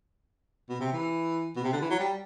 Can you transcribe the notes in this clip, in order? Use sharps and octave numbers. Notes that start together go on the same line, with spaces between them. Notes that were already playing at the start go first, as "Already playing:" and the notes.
B2
C3
E3
B2
C3
D3
E3
F#3
G3